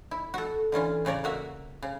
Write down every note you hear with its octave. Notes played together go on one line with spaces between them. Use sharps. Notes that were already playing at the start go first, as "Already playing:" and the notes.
E4
F#4 A4
D3 E3 C#4 F4
A2 C#3 C#5 D5 A#5
A#3 F#4 E5
C#3